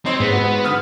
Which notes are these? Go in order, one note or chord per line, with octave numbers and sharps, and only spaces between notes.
C4 D#4 C#5 C6
G#2 B3
F#4
D3 D#6 F6